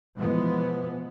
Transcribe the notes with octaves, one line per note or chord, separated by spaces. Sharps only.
B2 E3 F3 G#3 B3